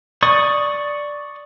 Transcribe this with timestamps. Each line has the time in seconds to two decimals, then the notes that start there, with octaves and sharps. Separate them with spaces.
0.23 D5 C#6 D#6